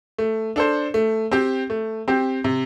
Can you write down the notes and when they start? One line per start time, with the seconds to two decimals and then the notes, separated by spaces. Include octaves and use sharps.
0.18 A3
0.56 D4 A4 C5
0.94 A3
1.31 C4 G4
1.70 A3
2.08 C4 G4
2.44 C3